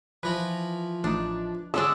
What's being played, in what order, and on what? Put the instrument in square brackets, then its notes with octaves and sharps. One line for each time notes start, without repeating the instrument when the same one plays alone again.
[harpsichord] E3 F3 [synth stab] B4 A#6
[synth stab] A1 D#4 [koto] D4
[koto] D3 G#3 D4 [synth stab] C#4 [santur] E6